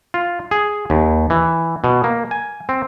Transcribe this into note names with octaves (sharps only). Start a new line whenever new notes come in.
F4
G#4
D#2
E3
B2
A#3
G#5
C4